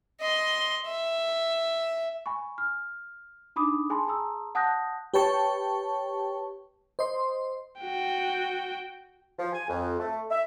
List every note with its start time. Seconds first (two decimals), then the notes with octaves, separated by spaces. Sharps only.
0.20 D#5 C6
0.86 E5
2.26 G#5 B5 C#6
2.58 F6
3.56 D4 D#4 B5 D6 D#6
3.90 G#4 G#5 A5 B5 C6
4.08 G#4 A5 A#5 C6 D#6 E6
4.55 F#5 A5 D#6 F#6 G6 A#6
5.14 G4 B4 C#5 G5 A5 C#6
6.99 C5 D#5 C6
7.81 F#4 G5
9.39 F3
9.53 G#5
9.68 F2
9.99 A3
10.30 E5